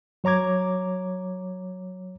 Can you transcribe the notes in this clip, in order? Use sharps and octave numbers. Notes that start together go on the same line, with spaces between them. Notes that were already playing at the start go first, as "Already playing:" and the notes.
F#3 C#5 A#5 D6 G#6